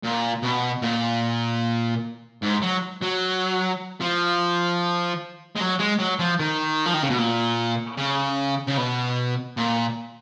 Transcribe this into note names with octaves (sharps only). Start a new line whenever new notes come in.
A#2
B2
A#2
G#2
F#3
F#3
F3
G#3
F#3
G#3
F#3
F3
D#3
F3
D#3
C#3
B2
A#2
C#3
C#3
B2
A#2